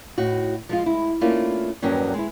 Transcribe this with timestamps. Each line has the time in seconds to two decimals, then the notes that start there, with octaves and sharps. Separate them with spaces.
0.18 A2 D#4 F#4
0.69 F3 G#3 F4
0.86 G#3 E4
1.21 A3 A#3 C#4 D4 E4 F4
1.82 E2 G2 D#3 F#3 A#3 C#4
2.14 G#3 E4